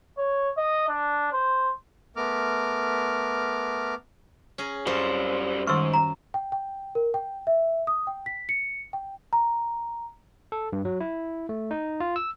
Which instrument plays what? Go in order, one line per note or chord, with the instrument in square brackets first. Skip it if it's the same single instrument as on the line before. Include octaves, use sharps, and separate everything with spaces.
[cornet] C#5
D#5
D4
C5
[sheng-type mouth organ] A3 B3 A#4 D6 F6
[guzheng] C#4 G#4 A#5
[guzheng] F#2 F4 A4 [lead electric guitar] G3 C5
[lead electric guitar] G#2 [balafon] D#3 G3 [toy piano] C#6 E6
[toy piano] A#5
[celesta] G5
G5
A#4
G5
E5
D#6
G5
B6
C#7
G5
A#5
[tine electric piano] A4
G2
F#3
E4
A3
D#4
F4
E6